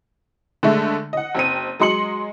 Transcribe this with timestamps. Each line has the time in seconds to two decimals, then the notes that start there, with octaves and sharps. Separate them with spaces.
0.63 D3 G#3 A3
1.13 D#5 F#5
1.35 F#1 C4 D#7
1.80 F#3 G#3 D#5 C6 C#7 F#7